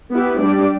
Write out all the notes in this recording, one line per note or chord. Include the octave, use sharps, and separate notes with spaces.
B3 E4 G4 B4
G3 D4 G4 D5